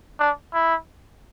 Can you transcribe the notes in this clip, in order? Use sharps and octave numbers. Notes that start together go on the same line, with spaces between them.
D4
E4